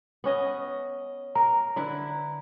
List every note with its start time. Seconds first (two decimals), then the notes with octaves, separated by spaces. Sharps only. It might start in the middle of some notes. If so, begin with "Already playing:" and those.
0.24 B3 C#4 D#5
1.35 A#4 A#5
1.76 D3 E4 B4